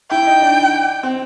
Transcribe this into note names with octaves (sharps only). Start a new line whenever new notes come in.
E4 G5
D#4
D4
C4